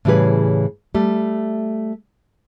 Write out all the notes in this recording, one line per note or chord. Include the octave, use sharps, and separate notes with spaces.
A2 C#3 E3 G3 G#4 B4
G3 A3